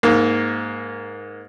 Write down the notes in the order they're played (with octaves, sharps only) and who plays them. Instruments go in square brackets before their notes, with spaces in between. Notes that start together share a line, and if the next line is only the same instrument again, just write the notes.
[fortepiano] G#2 A#3